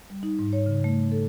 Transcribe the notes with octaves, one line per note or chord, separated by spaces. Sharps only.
G3
D#4
G#2
C#5
C#3
A3
A4